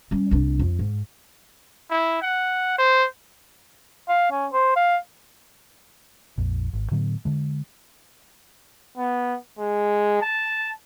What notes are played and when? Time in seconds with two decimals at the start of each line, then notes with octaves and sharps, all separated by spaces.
0.11 G3 C#4
0.31 C2 D4
0.59 F2
0.79 G#2
1.91 E4
2.22 F#5
2.78 C5
4.08 F5
4.31 C#4
4.53 C5
4.76 F5
6.38 A#1 F2
6.73 G#1
6.91 A2 D3 F#3 B3
7.25 D3 G#3
8.97 B3
9.59 G#3
10.21 A5